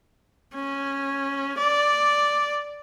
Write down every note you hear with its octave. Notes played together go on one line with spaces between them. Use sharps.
C#4
D5